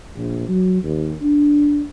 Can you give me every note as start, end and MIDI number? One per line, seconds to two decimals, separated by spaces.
0.15 0.46 34
0.49 0.81 54
0.83 1.15 39
1.22 1.84 62